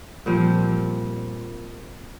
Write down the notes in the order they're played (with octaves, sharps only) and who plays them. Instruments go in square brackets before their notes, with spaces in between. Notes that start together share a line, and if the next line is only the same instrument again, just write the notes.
[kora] A#2 G3 C4 [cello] F3